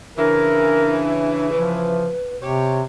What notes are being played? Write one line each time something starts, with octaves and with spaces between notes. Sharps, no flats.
C#3 E3 D4 A#4
F3 B4
C3 G4 C#5